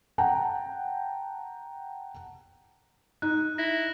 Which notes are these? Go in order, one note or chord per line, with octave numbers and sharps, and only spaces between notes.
F#5 G5 A5 A#5
D#4 F#6
E4 A#6